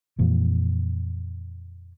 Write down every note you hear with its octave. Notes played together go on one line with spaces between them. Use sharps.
F2 A#2 E3